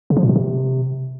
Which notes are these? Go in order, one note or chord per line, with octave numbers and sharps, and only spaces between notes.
C#3
F3
A#2
B2
C3